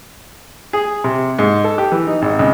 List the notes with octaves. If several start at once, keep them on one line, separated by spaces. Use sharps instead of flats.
G#4
C3
G#2
A4
G4
E3
D#4
G#1
C#2